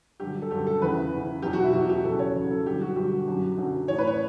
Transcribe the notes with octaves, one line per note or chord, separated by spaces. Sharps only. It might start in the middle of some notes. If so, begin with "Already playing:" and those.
G2 D3 F#3 G4
A4
G2 D3 F#3 G4
A4
E2 C#3 E3 B4
E2 C#3 E3
E2 B2 F#3 G4
F#4
E4
E2 B2 F#3 F#4
G4
E2 C#3 F#3 A4
C#5
E2 C#3 F#3
A4
G2 D3 F#3 G4
F#4
G2 D3 F#3 G4
F#2 D3 F#3
F#2 D3 F#3
A2 E3 C#5
B4
C#5